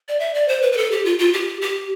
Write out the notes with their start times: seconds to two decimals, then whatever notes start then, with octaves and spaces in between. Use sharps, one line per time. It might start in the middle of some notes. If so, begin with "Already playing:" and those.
0.08 D5
0.20 E5
0.34 D5
0.48 C5
0.62 B4
0.73 B4
0.77 A4
0.91 G4
1.05 F4
1.19 F4
1.33 G4
1.62 G4